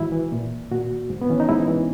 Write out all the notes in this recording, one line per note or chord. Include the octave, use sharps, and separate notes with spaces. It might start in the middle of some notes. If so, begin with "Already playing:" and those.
Already playing: G#2 E3 E4 F#4
E3
A#2
A#2 F#4
G#2
B3
E3 C#4
D#4
G#2 E4
E3